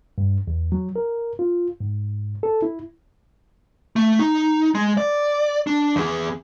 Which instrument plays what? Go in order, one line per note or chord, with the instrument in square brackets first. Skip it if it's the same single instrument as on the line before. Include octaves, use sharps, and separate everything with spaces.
[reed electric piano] G2
E2
F#3
A#4
F4
G#2
A4
E4
[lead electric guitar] A3
D#4
G#3
D5
D4
E2 G#4